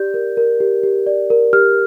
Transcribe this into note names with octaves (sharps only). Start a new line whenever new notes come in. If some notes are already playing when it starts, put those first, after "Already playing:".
Already playing: G4 D5 G6
A#4
A#4
G4
G4
D5
A#4
G4 F6